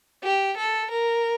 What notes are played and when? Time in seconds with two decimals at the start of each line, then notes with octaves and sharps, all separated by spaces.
0.23 G4
0.57 A4
0.91 A#4